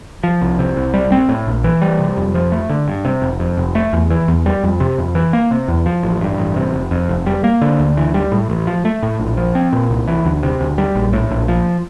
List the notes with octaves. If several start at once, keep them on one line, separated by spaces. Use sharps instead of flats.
F3
C2
C3
C2
G3
C4
A2
A#1
E3
G3
C3
F2
F3
A3
D3
G2
C3
F1
F2
F1
A3
E2
E3
E2
G3
F2
C3
F2
E3
A#3
C3
E2
F3
A1
G2
A1
C3
F1
F2
F1
G3
A#3
D3
D2
E3
G3
A2
A1
F3
A3
A2
A#1
F3
C4
A#2
C2
E3
D2
C3
D2
G3
A#1
A2
A#1
F3